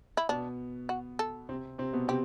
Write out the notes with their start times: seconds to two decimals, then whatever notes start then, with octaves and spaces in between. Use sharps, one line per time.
0.17 E4
0.29 B2 B3 D4
0.89 F#4
1.19 A4
1.49 C3 C4
1.78 C3 C4
1.93 B2 B3
2.08 C3 C4 G4